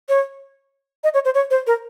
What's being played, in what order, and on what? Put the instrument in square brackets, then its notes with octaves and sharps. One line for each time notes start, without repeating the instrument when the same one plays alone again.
[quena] C#5
D#5
C#5
C5
C#5
C5
A#4